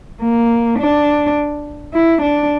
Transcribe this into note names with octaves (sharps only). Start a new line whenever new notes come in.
A#3
D4
E4
D4